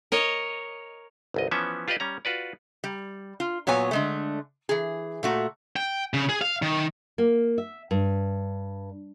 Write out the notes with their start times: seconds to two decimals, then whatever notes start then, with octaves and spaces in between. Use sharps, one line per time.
0.12 A#4 C#5 D#5
1.34 G1 C2 D#5
1.51 E3 F3 B3 C#4 E5
1.88 F4 G4 B4 D5 D#5
2.00 G3 C#4 A#5
2.25 F4 F#4 B4 D5
2.84 G3
3.40 F4
3.67 A#2 F#3 B3 C#5 G#5
3.91 D3 G#3 A3
4.69 E3 G#4
5.23 A#2 A3 F#4
5.76 G5
6.14 C#3
6.29 G#4
6.41 F5
6.62 D#3
7.18 A#3
7.58 E5
7.91 G2